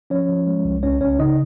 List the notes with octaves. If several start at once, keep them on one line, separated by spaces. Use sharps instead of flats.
F3 C#4 C#5
F3
G#3
C2
C#2 C#4 C#5
C#2 C#4 C#5
C#3 D#4 D#5